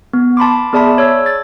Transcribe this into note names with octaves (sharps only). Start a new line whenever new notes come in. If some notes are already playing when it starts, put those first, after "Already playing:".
B3
A5 B5 C6 D6
B3 G#4 D5 E5 A5 B5
C#5 E6
A6